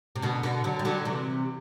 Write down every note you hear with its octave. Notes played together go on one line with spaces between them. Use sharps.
C3
B2 D3
B2 D3
D3 F#3
G3
D3 F#3
C3 E3